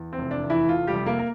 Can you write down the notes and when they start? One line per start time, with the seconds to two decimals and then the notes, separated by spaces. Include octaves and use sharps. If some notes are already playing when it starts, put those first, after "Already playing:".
Already playing: E2
0.13 C4
0.19 F1
0.31 D4
0.44 E2
0.50 E3 E4
0.69 F1 F3 F4
0.87 G3 G4
0.94 F1
1.06 A#3 A#4
1.19 A#4